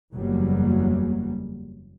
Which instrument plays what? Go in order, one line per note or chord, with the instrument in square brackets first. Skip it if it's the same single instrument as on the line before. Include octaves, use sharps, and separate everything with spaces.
[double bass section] F#1 E2 F#3 G3 A#3